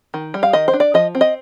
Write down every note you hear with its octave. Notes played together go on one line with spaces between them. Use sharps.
D#3
G3
F5
D#3 D#5
C5
D4
D5
F3 D#5
C4
D#5